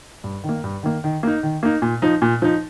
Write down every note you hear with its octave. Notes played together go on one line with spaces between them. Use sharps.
G2
D#3
A#3
G2
D#3 A#3
D#3
A#3 D#4
D#3
A#3 D#4
A#2
F3 D#4
A#2
F3 D#4